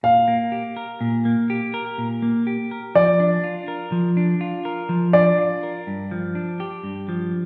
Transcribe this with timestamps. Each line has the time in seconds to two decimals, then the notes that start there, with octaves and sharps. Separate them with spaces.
0.03 A#2 F5
0.28 A#3
0.52 G4
0.77 A#4
1.01 A#2
1.25 A#3
1.50 G4
1.74 A#4
1.98 A#2
2.22 A#3
2.47 G4
2.71 A#4
2.95 F3 D5
3.20 D4
3.44 F4
3.68 A#4
3.92 F3
4.17 D4
4.41 F4
4.65 A#4
4.89 F3
5.13 D4 D5
5.38 F4
5.63 A#4
5.87 G2
6.11 F3
6.35 D4
6.60 G4
6.84 G2
7.09 F3